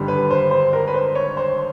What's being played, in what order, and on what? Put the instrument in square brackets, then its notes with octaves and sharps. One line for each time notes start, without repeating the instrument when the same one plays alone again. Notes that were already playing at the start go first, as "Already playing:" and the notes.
Already playing: [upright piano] G#1 G2 D3 G3
B4
C5
C5
A#4
B4
C5
C#5
C5